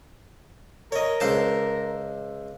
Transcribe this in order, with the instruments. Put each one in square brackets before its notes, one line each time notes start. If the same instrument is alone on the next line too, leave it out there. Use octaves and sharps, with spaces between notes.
[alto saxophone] A#4 [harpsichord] C#5 D#5
[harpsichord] C#2 C5 A5